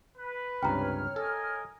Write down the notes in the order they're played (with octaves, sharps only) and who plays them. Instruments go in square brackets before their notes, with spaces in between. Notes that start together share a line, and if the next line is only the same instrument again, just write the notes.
[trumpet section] B4
[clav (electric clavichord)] C#2 G2 C3 [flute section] C#5 F6 [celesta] G5 A#5
[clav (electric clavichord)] A4 [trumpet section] A#4 D#5 G#5